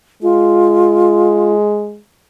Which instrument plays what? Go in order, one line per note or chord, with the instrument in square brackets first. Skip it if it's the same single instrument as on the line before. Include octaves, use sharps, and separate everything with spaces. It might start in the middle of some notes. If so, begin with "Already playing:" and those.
[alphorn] G#3 [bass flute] F4